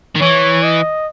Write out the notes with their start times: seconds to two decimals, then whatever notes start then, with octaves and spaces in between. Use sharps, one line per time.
0.16 D#3
0.21 E3 C#5
0.63 D#5